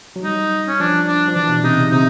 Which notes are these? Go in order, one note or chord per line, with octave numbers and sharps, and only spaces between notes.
F#3
G3 D#4
C#4
F3 D4
D4
F3
E3 D4
B2
C3 D#4
C#3
C3 D#4